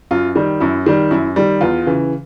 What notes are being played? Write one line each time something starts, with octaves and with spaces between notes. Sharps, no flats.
F#2 F4
D#3 G3
F#2 E4
D#3 G3
F#2 E4
D#3 G3
E2 F4
C#3 E3